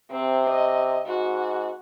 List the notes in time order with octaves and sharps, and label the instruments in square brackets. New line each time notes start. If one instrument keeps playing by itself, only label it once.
[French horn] C3 [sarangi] C4
[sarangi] D#5
[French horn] G#2 [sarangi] F#4